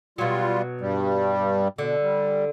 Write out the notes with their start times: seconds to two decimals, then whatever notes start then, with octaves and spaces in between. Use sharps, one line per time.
0.18 B2 F#3 G3 F4
0.81 G2 G3
1.78 B2 D3
2.01 G3